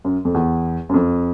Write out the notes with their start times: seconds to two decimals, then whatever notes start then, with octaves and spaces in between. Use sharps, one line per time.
0.04 F#2
0.25 F2
0.34 E2
0.89 F#2
0.94 F2